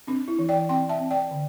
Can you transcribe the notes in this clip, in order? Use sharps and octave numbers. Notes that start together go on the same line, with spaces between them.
C4 D4
E4
E3
D5 G5
C4 G5 C6
E5 A5
C4
D5 G5
D3